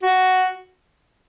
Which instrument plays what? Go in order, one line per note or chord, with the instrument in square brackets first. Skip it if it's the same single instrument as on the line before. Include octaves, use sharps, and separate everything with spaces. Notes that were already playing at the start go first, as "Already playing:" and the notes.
[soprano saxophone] F#4